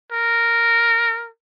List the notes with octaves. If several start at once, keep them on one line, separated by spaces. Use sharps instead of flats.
A#4